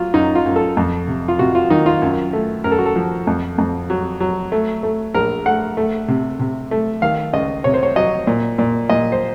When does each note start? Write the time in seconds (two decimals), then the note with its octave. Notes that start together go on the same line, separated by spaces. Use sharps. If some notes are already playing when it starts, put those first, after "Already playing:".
Already playing: F#3 F4
0.14 F#2 D#4
0.35 F4
0.46 F#2
0.56 A4
0.77 F2
1.08 C3
1.28 F4
1.39 C3 F#4
1.55 F4
1.70 D#3 D#4
1.86 F4
2.02 F#2
2.33 A3
2.64 F#2 A#4
2.72 A4
2.78 F#4
2.86 A4
2.96 F3
3.27 F2
3.58 F2
3.90 F#3
4.20 F#3
4.52 A3
4.83 A3
5.14 A#1 A#4
5.46 A3 F#5
5.77 A3
6.08 C3
6.39 C3
6.71 A3
7.02 D#3 F5
7.33 C#2 D#5
7.64 C3 C#5
7.74 C5
7.83 C#5
7.96 F#3 D#5
8.27 A#2
8.58 A#2
8.89 A#2 D#5
9.12 C5